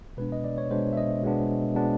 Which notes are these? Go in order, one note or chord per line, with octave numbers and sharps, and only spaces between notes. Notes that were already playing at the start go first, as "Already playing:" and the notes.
B2 G#3 B3 D4 B4
D#5
D5
C#5
B2 G#3 B3 D4 C5
E5
D#5
B2 G#3 B3 D4
B2 G#3 B3 D4